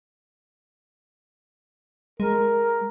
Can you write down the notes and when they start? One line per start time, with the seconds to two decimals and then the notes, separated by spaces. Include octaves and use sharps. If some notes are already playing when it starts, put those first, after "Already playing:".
2.20 G#3 A#4